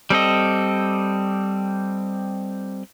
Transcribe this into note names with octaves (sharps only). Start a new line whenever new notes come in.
G3 C4 A4 D#5